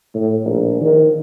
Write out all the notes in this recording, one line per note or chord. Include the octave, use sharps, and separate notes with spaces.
A2
A#1
D#3